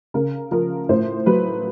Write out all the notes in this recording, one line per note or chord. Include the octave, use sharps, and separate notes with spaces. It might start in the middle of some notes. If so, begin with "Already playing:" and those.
C#3 A#4
F3 A#4
A2 C5
F#3 B4